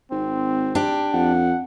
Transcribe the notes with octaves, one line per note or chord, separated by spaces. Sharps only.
G#1 C4
D4 G4
F2 F#5